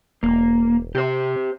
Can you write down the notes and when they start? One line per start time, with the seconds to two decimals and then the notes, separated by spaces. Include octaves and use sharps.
0.23 E1 A#3
0.95 C3 G4 C5